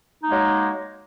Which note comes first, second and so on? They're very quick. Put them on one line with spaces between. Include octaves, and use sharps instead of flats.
D#4 A#3 G#3 F#3